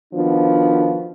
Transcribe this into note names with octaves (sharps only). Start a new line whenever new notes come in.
D#3 F3 B3 D4 F#4